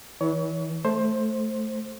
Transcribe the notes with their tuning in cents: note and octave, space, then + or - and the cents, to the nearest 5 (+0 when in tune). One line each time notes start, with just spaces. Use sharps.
E3 -30 C#5 +30
A3 -5 C5 +15